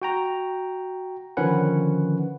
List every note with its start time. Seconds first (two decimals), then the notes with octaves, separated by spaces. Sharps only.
0.02 F#4 G5 A#5
1.37 D3 D#3 F3 C#4 B4 F#5